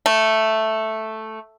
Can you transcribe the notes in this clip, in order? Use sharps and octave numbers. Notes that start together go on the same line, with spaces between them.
A3